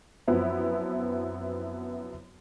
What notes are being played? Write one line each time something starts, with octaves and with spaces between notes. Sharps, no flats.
F#2 F3 B3 C4 E4